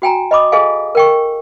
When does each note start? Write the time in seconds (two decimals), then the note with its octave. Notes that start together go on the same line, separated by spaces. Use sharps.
0.02 F#4 G5 G#5 A#5
0.31 D#5 B5 D6 D#6
0.52 G#4 A4 D#5 F5 G#5
0.95 A#4 G5 C#6